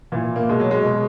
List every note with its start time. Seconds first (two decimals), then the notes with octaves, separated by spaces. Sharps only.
0.12 A#2 E3
0.36 A#3
0.49 B2 G#3
0.60 F#3
0.71 G#3
0.85 B2